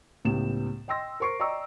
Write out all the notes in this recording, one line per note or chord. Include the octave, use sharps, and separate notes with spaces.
C#2 A2 B3 G4 E7
D#5 G5 C6 E6 A#6
A#4 C5 C#6 C7 D7
D5 D#5 G5 A#5 C#6 E6